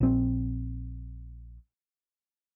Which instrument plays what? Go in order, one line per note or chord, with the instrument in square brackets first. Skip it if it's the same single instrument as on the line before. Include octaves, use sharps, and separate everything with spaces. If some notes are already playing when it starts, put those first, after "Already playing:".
[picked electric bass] A#1 C4